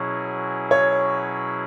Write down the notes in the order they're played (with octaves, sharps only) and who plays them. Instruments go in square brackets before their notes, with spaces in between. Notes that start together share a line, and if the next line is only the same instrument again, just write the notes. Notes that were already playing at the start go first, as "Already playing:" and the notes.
Already playing: [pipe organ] B2 F#3 C#4 E4 G#4
[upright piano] C#5